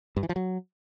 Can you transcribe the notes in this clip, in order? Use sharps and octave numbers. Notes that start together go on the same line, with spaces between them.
G2
E3
F3
F#3